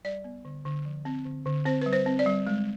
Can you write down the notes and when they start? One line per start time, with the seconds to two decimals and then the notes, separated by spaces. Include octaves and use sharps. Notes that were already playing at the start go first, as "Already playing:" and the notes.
0.05 G3 D5
0.24 B3
0.45 D3
0.65 D3
0.85 F3
1.05 C4
1.25 D3
1.45 D3
1.65 C4 C5
1.82 G3 B4
1.93 C5
2.06 C4
2.19 D5
2.26 G3
2.47 G#3